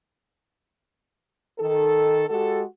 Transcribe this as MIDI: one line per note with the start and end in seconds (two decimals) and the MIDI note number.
1.59 2.24 51
1.59 2.24 69
2.28 2.62 56
2.28 2.62 66
2.28 2.62 67
2.28 2.62 69